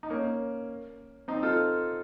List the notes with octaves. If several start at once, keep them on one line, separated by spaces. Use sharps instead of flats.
D#4
A#3 C#4
C4 D#4
F4 A4